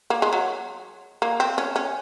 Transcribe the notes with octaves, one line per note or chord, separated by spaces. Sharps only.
A#3
G#3
F#3
A#3
C4
C#4
C#4